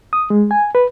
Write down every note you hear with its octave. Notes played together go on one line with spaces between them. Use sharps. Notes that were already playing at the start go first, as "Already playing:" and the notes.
D#6
G#3
G#5
B4